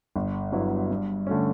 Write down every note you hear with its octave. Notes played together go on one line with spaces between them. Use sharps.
G1
G2 F#3 B3 E4
G2
D3 A3 C#4